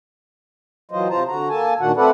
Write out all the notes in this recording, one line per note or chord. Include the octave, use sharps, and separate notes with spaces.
E3 F#3 F4 C5 D#5
C3 F4 C5 A5 A#5
D3 F#4 A#5
A#3 A4 G#5 A5
A#2 D#3 D4 F#4 F#5
A3 C4 A4 B4 D5 F#5